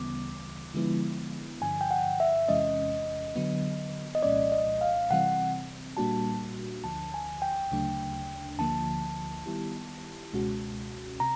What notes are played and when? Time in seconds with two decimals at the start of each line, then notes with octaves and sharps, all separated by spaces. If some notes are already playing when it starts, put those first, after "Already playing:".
Already playing: D2 C#3 E3 G3 B3 D6
0.74 D3 F3 G#3 B3 E4
1.61 G2 D3 F3 G#5
1.81 G5
1.91 F#5
2.20 E5
2.48 E2 C3 E3 G#3 C#4 D#5
3.36 D3 F#3 B3
4.15 D#5
4.22 C2 A#2 F3 G#3 C#4 D5
4.52 D#5
4.81 F5
5.10 C3 E3 G3 C4 F#5
5.97 A#2 G3 A#3 D4 F#4 A5
6.84 D2 D3 F3 A5
7.14 G#5
7.42 G5
7.71 D2 C#3 F#3 A3 D4
8.59 D2 D3 F3 A#3 A5
9.46 D#3 G3 B3 E4 G4
10.33 C#2 B2 G#3 C#4 F#4
11.20 C3 A#5